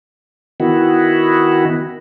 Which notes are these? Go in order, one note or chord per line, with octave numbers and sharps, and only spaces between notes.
D#3 B3 E4 F#4